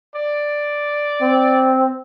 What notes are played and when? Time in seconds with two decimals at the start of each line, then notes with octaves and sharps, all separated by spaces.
0.16 D5
1.21 C4